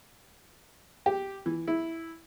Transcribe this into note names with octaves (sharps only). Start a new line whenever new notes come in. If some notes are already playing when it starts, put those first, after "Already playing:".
G4
E3
E4